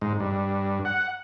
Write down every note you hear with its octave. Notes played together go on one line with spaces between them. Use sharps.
G#2
G2
F#5